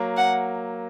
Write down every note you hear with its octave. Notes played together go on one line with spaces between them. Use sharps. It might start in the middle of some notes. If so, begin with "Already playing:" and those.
Already playing: F#3 A#3
F#5